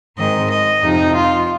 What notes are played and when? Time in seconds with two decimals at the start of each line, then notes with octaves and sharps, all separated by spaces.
0.17 G#2 D#3 G#3 C4 D#5
0.50 D#5
0.82 F2 C3 F3 D#4
1.15 F4